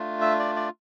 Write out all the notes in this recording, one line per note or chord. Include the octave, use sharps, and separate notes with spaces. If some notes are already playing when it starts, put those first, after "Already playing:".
Already playing: A3 D4 F4
E5
D5
D5